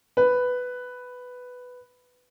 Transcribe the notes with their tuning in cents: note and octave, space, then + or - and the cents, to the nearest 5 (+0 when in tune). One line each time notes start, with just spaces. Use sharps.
B4 +5